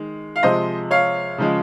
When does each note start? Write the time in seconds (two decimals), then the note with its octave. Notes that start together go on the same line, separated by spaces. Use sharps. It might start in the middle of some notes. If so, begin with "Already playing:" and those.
Already playing: D#3 G#3
0.36 F5
0.43 C3 F3 G#3 C5 D#5
0.91 C#5 F5
1.38 C#3 F3 G#3